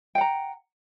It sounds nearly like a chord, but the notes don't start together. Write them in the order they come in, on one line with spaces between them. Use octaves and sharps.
G5 F#5 A#5